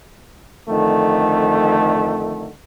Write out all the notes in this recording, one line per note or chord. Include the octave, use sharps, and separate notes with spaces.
F2 D3 D#3 A3